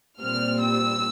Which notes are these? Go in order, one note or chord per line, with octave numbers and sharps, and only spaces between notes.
A#2 G3 C4 F6
E6